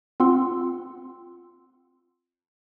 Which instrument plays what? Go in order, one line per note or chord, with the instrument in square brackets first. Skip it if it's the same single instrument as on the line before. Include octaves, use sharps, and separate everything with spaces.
[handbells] C4 F4 F#5 C6 E6